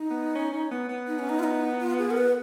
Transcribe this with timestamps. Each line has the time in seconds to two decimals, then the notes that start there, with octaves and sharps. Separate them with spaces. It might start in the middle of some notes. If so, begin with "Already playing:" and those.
Already playing: D#4
0.10 B3
0.35 C#4
0.53 C#4
0.71 B3
0.89 B3
1.07 D#4
1.19 C#4
1.29 D#4
1.39 F4
1.43 D#4
1.81 F4
1.98 G#4
2.11 A#4
2.17 B4